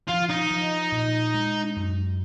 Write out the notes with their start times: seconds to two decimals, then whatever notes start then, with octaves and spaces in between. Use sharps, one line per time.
0.09 F3 F4
0.30 D#4
0.51 F3
0.92 A#2
1.34 G#3
1.76 F#2